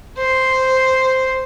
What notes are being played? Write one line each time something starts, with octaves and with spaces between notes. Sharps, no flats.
C5